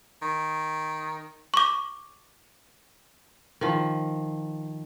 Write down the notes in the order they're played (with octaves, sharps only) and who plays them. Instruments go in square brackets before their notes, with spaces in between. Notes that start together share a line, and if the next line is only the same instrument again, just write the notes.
[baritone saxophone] D#3
[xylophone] C#6 D6
[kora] D#3 F3